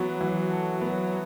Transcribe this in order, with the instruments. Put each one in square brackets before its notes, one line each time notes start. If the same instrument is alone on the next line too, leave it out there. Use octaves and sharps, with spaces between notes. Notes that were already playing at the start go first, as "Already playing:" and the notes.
Already playing: [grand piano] E3 B3 [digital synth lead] F#3
[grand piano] E3
A4
B3